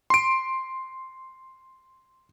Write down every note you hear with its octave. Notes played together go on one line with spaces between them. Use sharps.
C6 D7